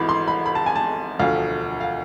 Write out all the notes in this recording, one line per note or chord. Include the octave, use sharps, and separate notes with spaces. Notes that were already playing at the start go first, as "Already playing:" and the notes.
Already playing: G#1 G#2 E3 B5
C6
B5
B5
A5
G#5
A5
E1 D2 D3 F3 F5
F5